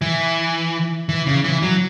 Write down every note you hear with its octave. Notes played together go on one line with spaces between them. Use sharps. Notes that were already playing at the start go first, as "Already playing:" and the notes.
E3
E3
C#3
E3
F#3